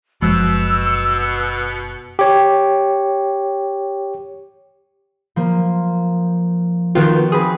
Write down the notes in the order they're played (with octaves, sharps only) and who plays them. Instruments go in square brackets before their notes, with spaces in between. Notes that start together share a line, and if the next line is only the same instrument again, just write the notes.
[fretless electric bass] F#1 F3 G#3 [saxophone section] B2 [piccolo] E6
[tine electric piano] G4 C#5
[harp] F3 A#3
[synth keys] D#3 B3 F4 [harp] F#4 G5
[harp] C4 B4 [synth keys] G#4